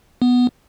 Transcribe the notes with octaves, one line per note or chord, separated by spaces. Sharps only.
B3